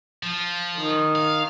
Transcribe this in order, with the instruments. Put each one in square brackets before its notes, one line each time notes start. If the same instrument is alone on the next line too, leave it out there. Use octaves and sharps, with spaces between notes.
[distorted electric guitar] F3
[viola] D#3
[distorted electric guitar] F5